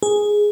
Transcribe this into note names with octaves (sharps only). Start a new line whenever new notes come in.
G#4